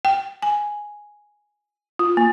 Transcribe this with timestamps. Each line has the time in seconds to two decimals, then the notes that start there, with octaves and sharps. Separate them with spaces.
0.05 G5
0.42 G#5
1.99 F4
2.17 A#3